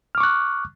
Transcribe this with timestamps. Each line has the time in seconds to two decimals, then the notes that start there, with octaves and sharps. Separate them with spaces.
0.15 F6
0.18 D6
0.20 C#6
0.23 F#6